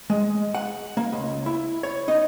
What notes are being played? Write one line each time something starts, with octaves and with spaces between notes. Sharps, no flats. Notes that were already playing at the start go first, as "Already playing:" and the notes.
G#3
F#5
A#3
C#2
E4
C#5
D#4